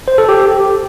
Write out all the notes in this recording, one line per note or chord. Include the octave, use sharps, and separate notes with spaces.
C5
A4
G4